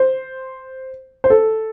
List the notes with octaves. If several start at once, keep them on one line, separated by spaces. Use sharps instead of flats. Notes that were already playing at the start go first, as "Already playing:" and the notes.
Already playing: C5
C5
A4